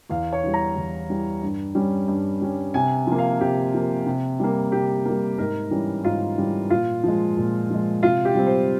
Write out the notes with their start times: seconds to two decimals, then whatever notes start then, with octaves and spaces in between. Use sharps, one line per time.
0.10 E2 F5
0.32 C#5
0.43 E3 G3
0.54 A#5
0.76 E2
1.10 E3 G3
1.42 G2
1.75 G3 C#4
2.08 G2
2.41 G3 C#4
2.74 C3 G#5
3.07 F3 A#3
3.19 F5
3.40 C3 G4
3.74 F3 A#3
4.06 C3
4.40 G3 A#3
4.72 C3 G4
5.05 G3 A#3
5.38 G#2 A#4
5.71 E3 G3 C#4
6.04 G#2 F4
6.38 E3 G3 C#4
6.70 A#2 F4
7.03 F3 G#3
7.37 A#2
7.70 F3 G#3
8.03 C3 F4
8.25 G4
8.35 G3 C4
8.47 C5